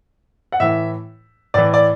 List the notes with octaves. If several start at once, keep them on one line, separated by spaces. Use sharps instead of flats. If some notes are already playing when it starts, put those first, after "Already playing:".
F#5
A2 E3 E5
A2 E3 D5
D5